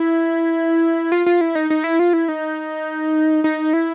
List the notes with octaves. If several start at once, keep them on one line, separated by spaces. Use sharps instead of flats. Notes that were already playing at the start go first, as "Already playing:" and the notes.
Already playing: E4
F4
F4
E4
D#4
D#4
E4
F4
E4
D#4
D#4
E4